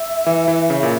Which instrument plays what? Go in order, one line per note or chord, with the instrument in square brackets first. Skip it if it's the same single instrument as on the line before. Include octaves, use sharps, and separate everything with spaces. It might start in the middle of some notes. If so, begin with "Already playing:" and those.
Already playing: [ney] E5
[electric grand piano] E3
E3
C#3
A#2